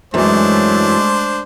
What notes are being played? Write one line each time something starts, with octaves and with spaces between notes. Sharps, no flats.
F#2 E3 F#3 G#3 A3 D4 C5